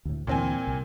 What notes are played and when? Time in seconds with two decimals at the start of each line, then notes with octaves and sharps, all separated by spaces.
0.05 D2 A2
0.27 D2 A#2 D3 E3 C4 G#5
0.67 C2